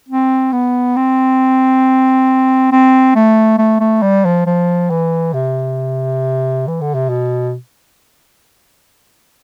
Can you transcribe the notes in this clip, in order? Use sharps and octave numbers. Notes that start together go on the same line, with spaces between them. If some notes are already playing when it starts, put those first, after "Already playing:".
C4
B3
C4
C4
A3
A3
A3
G3
F3
F3
E3
C3
E3
D3
C3
B2